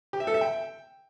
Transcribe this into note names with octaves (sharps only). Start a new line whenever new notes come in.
G4
E5
A4
E5
G5